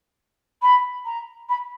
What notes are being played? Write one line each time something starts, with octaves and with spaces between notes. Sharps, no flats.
B5
A#5
B5